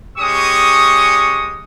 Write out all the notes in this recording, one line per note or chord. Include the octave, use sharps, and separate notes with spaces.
G#3 C#4 G4 C#6 D#6